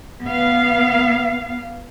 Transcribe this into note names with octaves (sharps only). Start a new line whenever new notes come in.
B3 F5